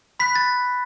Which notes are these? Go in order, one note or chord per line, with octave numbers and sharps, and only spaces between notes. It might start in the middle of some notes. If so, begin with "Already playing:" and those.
B5 F#6 B6
A6